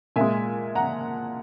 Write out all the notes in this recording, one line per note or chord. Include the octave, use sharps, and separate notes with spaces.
A#2 G#3 E5 G#5
F#5 A#5